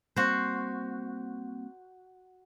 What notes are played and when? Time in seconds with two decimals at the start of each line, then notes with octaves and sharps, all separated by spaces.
0.16 G3 A#3 C4 F#4 C5